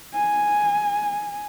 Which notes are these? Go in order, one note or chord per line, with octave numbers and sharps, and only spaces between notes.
G#5